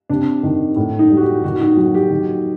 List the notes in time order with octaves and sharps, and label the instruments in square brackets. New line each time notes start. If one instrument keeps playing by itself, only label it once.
[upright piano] C3 [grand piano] D4
[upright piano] D#3
A2
[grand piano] D#4
[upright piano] G3
[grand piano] F#4
G4
[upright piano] D#3 [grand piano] F#4
[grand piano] D#4
[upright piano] F#3 [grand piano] F#4
[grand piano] G4
[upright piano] D#3